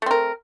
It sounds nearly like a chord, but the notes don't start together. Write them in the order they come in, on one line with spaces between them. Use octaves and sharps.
A3 C4 A#4